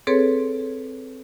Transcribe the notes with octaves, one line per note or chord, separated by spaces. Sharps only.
C4 G#4 A4 B4 C#5 C6